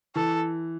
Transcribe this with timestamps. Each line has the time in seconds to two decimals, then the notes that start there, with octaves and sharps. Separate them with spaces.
0.16 E3 A4